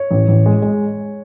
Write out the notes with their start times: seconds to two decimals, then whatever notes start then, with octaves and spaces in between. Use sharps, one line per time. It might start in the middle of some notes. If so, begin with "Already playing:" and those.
Already playing: C#5
0.11 A1
0.28 A1
0.46 G#3
0.62 G#3